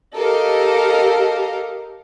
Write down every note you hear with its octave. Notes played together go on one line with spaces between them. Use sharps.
G4 A4 A#4 D#5 F5